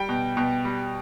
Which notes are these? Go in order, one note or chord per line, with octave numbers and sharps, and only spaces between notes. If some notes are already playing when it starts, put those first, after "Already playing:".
Already playing: G3 G5
B2
B2
G3